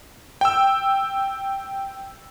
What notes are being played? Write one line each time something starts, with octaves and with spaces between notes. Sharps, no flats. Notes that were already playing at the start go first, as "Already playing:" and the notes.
G5 E6